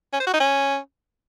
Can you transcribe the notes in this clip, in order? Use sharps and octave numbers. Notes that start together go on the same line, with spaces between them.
C#4
C5
F#4
D#4
C#4